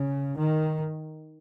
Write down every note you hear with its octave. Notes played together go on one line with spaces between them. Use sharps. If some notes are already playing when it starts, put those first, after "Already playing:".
Already playing: C#3
D#3